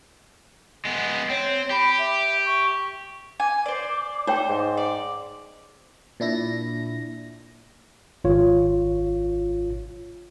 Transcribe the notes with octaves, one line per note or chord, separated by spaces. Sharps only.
G#3 B3
C4 C#5
G4 B5
E5
C#6
G#5 D6
C5 D5
D#4 C5 C#5 G5
G#2
D5 D6
A#2 D4 E4 A#6
G#1 F4 C#5